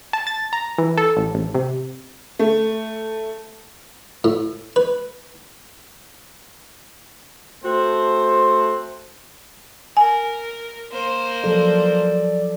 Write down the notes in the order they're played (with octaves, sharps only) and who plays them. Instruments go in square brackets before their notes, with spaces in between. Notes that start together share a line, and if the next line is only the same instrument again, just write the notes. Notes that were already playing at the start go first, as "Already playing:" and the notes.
[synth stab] A5
A6
A#5
E3
A4
A1
A1
C3
[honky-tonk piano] A3
[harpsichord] A2
B4
[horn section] A3 C4 F#4 C5
[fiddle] A#4 [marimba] G#5
[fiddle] A#3 C5
[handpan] F3 F#3 A4 [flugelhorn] D5